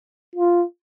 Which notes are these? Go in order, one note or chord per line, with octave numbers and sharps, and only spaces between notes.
F4